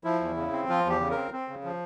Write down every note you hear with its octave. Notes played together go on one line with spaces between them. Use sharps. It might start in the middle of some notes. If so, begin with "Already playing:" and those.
F3 E4
E2
C#3
C4
F3 F4
E2 G4
C#3
C4 A#4
C4
C#3
F3